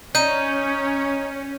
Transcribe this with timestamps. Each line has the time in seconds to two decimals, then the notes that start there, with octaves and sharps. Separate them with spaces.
0.15 C#4 D#4 G6 D#7